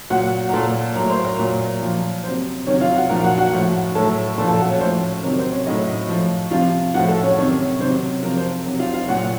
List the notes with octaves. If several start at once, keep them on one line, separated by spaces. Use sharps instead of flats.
A#2 F#3 F#4 F#5
A#5
A#2 F#3 A4 A5
F#3 A#4 A#5
A2
C5 C6
A#4 A#5
A#2 F#3
A#2 F3
C3 F#3 C5
C3 D#3 F#3 C#4 C#5
F4 F5
F#4 F#5
A#2 F3 A#4 A#5
F5
F#4 F#5
F#4 F#5
A2 F3
A2 F#3 A4 A5
A#2 F3 A4 A5
A4 A5
F#4 F#5
C#4 C#5
A2 F3 C5
C3 D#3 F#3 A#4
C5
C#4 C#5
A2 F#3 D#4 D#5
A2 F3
C3 F3 F4 F5
A2 F3 F#4 F#5
A4 A5
C#4 C#5
C3 D#3 F#3 C#4 C#5
C3 D#3 F#3 C5
C3 F3 A#4
C5
C3 F#3
F4 F5
F4 F5
A#2 F#3 F#4 F#5